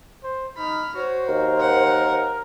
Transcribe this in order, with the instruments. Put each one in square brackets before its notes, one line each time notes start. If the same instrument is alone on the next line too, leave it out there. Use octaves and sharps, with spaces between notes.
[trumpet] C5
[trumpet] D#4 [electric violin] B5 F6
[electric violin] F#4 [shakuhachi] C5 [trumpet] C#5
[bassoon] D#2 [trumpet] A#4
[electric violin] F#5